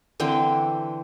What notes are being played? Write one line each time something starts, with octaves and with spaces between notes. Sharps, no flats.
D3 E3 C4 G5